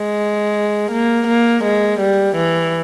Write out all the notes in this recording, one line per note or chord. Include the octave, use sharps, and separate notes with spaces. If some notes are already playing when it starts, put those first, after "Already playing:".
Already playing: G#3
A#3
A#3
G#3
G3
E3